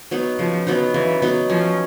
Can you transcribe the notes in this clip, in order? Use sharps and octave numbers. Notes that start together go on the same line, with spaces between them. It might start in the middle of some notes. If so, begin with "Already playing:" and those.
F#3 B3 D#4
C#3 F3
F#3 B3 D#4
C#3 E3
F#3 B3 D#4
F3 C#4